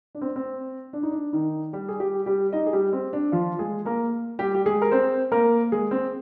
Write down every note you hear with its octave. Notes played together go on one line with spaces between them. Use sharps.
D4
C4
C4
D4
D#4
D4
D#3 D#4
G3 G4
G#4
G3 G4
G3 G4
D#4 D#5
G#4
G3 G4
C4
D4
F3 F4
G#3 G#4
A#3 A#4
G3 G4
G4
G#3 G#4
A#4
C4 C5
A#3 A#4
G#3 G#4
C4